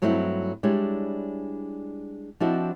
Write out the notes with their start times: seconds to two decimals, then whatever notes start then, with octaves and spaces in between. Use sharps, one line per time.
0.02 G2 F#3 A3 C4 D#4 E4
0.63 G3 G#3 D4 E4 C#5
2.40 F3 C4 D4 E4 F#4 D#5